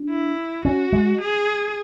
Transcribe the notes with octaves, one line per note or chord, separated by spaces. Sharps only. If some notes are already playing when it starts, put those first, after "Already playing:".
Already playing: D4
E4
C#4 F#4
G#3
G#4